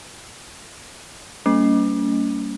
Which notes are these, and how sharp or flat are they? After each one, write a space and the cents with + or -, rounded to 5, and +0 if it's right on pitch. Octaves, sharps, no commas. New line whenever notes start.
G3 -20 A#3 -30 C#4 +35